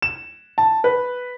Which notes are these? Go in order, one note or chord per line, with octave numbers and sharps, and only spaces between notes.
E7
A5
B4